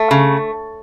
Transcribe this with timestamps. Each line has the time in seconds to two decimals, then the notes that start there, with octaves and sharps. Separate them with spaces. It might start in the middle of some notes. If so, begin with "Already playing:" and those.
Already playing: A3
0.11 C#3